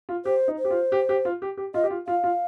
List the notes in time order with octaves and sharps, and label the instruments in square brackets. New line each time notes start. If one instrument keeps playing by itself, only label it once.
[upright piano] F4
[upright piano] G4 [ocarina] C5
[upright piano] D#4
[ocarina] C5
[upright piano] G4
F4
G4
G4
F4
G4
G4
[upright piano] F4 [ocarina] D#5
[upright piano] G4
F4
[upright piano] F4 [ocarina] F5
[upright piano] F4